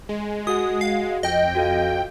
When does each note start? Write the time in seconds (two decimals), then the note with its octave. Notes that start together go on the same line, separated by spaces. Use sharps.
0.09 G#3
0.47 F#4 G#4 F#5 D#6
0.81 F5
1.23 F2 D#5 G5
1.55 F#4 A4 F5